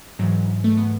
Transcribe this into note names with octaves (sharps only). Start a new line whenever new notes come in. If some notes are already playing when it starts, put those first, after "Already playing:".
G#2 E3 F#3
A3
B3